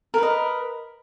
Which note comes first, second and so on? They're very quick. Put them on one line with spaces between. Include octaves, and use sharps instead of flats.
A#4 B4 D#5